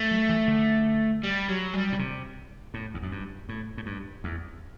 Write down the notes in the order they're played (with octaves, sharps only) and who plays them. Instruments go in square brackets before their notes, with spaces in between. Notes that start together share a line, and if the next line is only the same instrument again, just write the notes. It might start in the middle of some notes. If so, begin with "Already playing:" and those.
Already playing: [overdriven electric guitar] A3
[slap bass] F#3
E3
D3
[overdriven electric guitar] G3
F#3
G3
[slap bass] B2
C3
A2
E2
F#2
G2
A2
A2
G2
E2